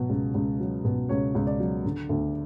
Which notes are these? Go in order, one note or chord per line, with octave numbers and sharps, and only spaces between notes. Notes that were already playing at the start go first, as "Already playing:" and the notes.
Already playing: B2 F#3
C#2
C#2
F#3
B2
C#2 C#5
C#2
D5
F#3
D3
D2